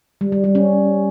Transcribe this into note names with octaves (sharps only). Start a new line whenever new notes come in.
G3
G3
G3
C#4